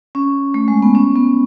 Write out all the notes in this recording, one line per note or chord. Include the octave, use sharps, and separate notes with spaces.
C#4
A3
G#3
B3
C#4
B3